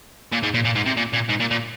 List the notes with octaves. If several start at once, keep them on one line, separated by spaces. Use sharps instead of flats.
A#2
G#2
A#2
A#2
G#2
C3
A#2
A#2
G#2
A#2
A#2